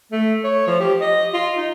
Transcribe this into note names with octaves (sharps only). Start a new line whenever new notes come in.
A3
C#5
F3
G4
D#5
F4
D#4